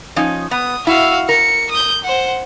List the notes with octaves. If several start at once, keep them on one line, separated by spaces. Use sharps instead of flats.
F3 C#4 D#4
B3 D#6
E4 F#4 F5
A#4 C#7
D#6 G6
C5 F#5